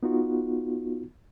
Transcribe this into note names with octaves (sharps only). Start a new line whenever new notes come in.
B3 D#4 F4 F#4